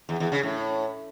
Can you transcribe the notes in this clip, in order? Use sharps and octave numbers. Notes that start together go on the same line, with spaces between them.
E2
E2
C#3
A2